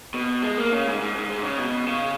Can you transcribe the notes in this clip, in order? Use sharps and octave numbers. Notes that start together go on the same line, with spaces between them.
B2
G#3
A#3
C#3
G#2
G#2
G#2
G#2
C#3
B2
C#3